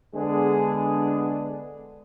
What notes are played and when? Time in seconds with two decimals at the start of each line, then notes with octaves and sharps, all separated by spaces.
0.15 D3 G#3 B3 D4 G#4